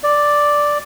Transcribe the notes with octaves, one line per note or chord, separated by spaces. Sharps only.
D5